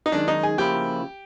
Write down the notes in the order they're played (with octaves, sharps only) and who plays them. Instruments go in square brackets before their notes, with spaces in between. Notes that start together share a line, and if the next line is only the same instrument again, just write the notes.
[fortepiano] D#4
[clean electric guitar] F#2 D#3 G#3 [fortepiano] D4
[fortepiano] D#4
G#4
[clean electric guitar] C#3 F3 A#3 C#4 E4 [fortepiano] G4